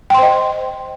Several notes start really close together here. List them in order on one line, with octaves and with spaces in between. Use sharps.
G5 C6 C5 D#5